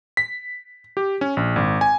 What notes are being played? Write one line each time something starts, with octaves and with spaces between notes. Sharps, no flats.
B6
G4
C#4
A#1
G#1
G#5